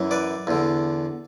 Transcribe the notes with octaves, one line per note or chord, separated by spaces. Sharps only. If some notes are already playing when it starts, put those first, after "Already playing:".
Already playing: F#2 E3
B4 D5
E2 D3